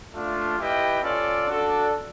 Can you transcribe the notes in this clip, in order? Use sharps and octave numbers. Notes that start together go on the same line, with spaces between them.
A3 D4 F4
E4 G4 B4 D#5 G5
C#4 F4 A4 D5
D4 F#4 A4 D5